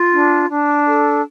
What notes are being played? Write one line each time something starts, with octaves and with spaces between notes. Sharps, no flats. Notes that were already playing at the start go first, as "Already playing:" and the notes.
Already playing: F4
D4
D4
A4